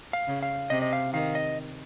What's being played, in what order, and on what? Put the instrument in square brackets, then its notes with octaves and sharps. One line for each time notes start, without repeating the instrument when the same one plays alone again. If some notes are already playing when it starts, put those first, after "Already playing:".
[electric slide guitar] F5
[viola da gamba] C#3
[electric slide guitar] F5
[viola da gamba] C3 [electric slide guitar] D#5
[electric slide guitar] D#5
F5
[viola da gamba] D#3 [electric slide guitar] F5
[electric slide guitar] D#5